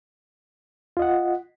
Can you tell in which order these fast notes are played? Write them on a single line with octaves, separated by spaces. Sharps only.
F4 D#5 F#5